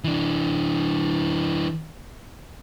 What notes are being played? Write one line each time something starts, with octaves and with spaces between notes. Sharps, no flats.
E3 D4